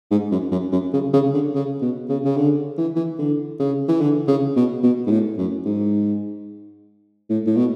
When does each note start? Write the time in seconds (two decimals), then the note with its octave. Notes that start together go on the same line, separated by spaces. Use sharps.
0.11 G#2
0.32 F#2
0.52 F#2
0.72 F#2
0.93 C#3
1.13 C#3
1.34 D3
1.55 C#3
1.82 B2
2.09 C#3
2.25 C#3
2.37 D3
2.78 E3
2.96 E3
3.19 D3
3.60 C#3
3.88 E3
4.01 D3
4.28 C#3
4.56 B2
4.83 B2
5.06 G#2
5.11 A2
5.38 F#2
5.66 G#2
7.30 A2
7.47 A2
7.57 B2